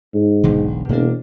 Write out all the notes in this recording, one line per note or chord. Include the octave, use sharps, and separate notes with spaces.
G#2
E1 B1 D3
E1 B2 A#3 D4